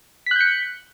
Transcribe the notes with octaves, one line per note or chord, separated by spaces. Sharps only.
F#6 G6 B6 C#7